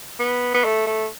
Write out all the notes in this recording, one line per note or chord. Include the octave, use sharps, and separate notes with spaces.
B3
B3
A3
A3